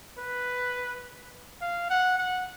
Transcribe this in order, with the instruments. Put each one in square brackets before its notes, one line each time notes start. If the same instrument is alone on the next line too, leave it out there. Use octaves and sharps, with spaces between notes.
[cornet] B4
F5
F#5
F#5